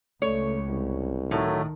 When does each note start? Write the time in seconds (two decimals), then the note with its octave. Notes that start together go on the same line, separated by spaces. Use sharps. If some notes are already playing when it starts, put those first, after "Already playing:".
0.22 C#2 A3 C#5
0.69 C2
1.31 A2 D#3 F#3 A3